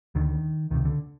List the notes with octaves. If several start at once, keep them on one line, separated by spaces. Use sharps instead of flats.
D2 D3 D#3
C#2 C3 D#3
D3